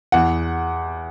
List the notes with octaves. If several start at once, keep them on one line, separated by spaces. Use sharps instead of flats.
E2 F#5